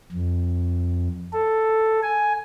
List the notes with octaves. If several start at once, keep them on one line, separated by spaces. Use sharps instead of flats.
F2
A4
G#5